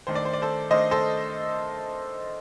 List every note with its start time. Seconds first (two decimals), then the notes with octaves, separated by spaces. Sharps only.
0.07 D#3 A3 D4 C5
0.15 D5
0.25 C5
0.33 D5
0.42 A4 C5
0.70 D#3 A3 D4 C5 D#5
0.91 A4 C5